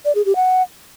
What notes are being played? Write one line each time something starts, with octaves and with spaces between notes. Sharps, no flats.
D5
G#4
G4
F#5